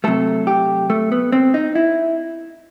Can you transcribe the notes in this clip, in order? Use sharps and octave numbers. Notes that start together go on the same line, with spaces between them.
C3 F#3 A3 A4
G4
A3
B3
C4
D#4
E4